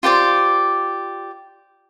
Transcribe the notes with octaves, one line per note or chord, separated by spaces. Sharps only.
F4 G4 C5 D5